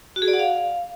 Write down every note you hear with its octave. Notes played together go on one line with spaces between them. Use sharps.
F#4
G#4
D5
F#5
F5